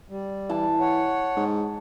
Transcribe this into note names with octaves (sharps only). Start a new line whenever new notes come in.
G3
E3 A5
C#5 F#5
G#2